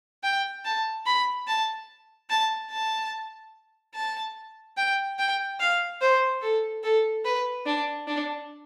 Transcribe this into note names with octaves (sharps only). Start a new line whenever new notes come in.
G5
A5
B5
A5
A5
A5
A5
G5
G5
F5
C5
A4
A4
B4
D4
D4